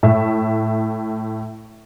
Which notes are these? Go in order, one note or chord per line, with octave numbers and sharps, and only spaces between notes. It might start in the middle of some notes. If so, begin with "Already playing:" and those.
A2 E5